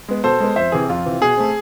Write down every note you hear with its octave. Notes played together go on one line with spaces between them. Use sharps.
G#3 B3
B2 A4 C5
G#3 B3
F2 C5 E5
C3 E3 G#4
F2 F4
C3 E3
B2 G#4
A3 C4